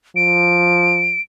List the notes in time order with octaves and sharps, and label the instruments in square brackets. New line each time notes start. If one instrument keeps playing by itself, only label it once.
[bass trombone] F3 [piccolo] D7